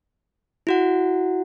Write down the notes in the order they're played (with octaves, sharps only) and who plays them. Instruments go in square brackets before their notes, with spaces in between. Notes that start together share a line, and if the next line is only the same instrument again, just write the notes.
[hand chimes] E4 F#4 F#5